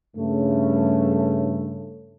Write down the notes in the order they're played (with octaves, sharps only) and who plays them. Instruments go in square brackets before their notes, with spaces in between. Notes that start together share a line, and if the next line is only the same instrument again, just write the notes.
[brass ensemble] G2 C#3 A3